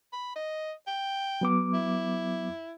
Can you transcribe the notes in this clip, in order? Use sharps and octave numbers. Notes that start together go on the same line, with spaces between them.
B5
D#5
G5
F#3 B3 D6
E4